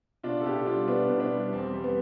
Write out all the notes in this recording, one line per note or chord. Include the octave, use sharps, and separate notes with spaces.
B2 D4 F4
A4
B2 E4 G4
G3 D4 F4
B2 B3 D4
B2
E4
B3 D4
G3
E2 C4
G3
B3